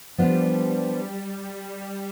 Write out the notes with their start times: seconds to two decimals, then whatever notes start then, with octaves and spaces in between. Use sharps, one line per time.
0.18 F3 G3 B3 D4 F4